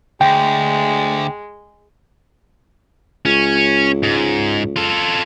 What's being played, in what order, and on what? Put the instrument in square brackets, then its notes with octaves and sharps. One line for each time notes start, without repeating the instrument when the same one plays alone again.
[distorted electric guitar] D2 [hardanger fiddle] G#3 [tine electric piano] G5
[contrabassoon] C#2 [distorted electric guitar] C#4
[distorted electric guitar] G#2
F4 A4